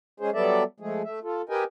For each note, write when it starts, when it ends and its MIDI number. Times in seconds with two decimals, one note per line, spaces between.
0.20 0.30 56
0.20 0.30 61
0.20 0.30 68
0.20 0.30 72
0.33 0.63 54
0.33 0.63 55
0.33 0.63 59
0.33 0.63 69
0.33 0.63 74
0.33 0.63 76
0.80 1.02 53
0.80 1.02 56
0.80 1.02 57
0.80 1.02 68
1.04 1.19 57
1.04 1.19 76
1.23 1.42 65
1.23 1.42 69
1.49 1.64 67
1.49 1.64 70
1.49 1.64 71
1.49 1.64 75
1.49 1.64 79
1.49 1.64 80